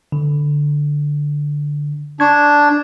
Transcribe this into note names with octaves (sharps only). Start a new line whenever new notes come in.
D3
D4 C#6 G#6